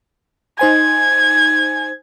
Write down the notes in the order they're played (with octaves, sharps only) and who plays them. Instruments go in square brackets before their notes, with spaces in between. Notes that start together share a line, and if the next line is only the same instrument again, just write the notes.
[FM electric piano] D#4 C5 G#5 [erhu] G#6